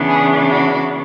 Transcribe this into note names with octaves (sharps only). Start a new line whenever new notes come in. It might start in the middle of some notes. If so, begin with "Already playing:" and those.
Already playing: C#3 E3 B3 D4
G#4
F#4